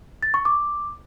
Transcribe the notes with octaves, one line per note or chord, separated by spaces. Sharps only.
A6
C#6
D6